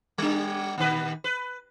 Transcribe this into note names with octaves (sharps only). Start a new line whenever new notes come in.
G3 D4
A#2 D#3 B4
B4